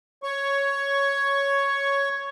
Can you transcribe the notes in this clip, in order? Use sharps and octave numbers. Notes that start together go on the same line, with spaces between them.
C#5 C#6